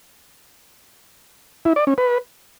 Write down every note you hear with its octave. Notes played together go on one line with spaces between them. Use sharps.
E4
D5
C#4
B4